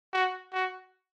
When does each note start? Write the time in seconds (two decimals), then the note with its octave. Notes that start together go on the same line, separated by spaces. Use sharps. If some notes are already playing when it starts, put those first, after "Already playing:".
0.13 F#4
0.53 F#4